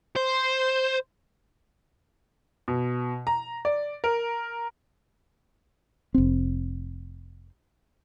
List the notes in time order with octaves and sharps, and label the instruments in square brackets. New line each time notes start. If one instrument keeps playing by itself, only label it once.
[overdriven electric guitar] C5
[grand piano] B2
A#5
D5
A#4
[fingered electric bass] F1 C4